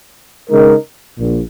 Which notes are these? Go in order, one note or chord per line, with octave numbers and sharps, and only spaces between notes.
C#3 G#3 D#4 A#4
A#1 A#2